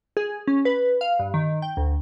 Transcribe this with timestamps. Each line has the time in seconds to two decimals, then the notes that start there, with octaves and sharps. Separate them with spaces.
0.17 G#4
0.47 C#4
0.65 B4
1.01 F5
1.19 G2
1.34 D#3
1.62 G5
1.77 D2